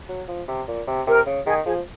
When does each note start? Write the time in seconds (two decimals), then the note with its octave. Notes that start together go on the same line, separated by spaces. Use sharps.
0.09 F#3
0.28 F3
0.48 C3
0.68 A#2
0.88 C3
1.07 C3 A#4
1.26 C#3
1.46 D#3 G#4
1.66 F3 G#4